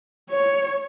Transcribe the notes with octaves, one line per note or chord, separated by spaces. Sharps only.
C#5